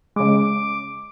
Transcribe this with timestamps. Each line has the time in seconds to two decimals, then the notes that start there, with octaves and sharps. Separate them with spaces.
0.16 C#3 G#3 D6